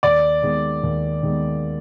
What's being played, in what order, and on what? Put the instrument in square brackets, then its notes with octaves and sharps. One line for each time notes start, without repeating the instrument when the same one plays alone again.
[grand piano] D#2 [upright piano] D5
[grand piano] D#3 G#3 B3
D#2
D#3 G#3 B3